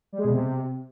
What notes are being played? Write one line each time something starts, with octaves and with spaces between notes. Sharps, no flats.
G3
G#3
B2
C3